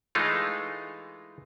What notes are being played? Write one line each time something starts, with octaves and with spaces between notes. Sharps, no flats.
E3 G#3 A3 D#4 F4